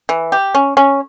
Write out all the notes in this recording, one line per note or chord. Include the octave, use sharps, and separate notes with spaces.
E3
G4
C#4
C#4